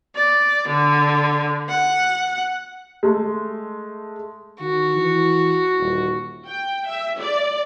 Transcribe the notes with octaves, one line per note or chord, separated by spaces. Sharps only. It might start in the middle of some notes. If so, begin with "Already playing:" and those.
D5
D3
F#5
G#3 A3
D#3 F#4
E3
D#1
G5
E5
D5